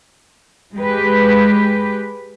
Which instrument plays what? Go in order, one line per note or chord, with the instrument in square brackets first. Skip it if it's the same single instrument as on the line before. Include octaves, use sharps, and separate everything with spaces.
[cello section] G#3 G4 B4